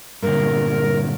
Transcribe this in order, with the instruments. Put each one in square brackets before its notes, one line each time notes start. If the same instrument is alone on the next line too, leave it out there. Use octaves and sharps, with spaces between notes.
[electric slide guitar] G2 A#2 D3 [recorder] A#4